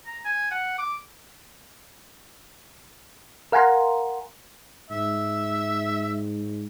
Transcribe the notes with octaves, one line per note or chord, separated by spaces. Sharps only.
A#5
G#5
F#5
D6
A#4 F5 F#5 G#5 A#5 C6
G#2 E5